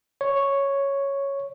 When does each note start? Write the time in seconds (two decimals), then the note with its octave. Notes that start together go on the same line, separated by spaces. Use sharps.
0.21 C#5